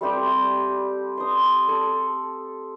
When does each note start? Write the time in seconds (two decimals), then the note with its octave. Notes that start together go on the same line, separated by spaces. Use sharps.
0.01 G3 A3 C4 G4
1.17 C6 D#6
1.68 A4